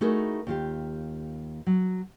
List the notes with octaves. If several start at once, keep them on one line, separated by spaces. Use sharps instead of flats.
A3 D#4 E4 F#4 G#4 A#4
D#2 F4 G4
F#3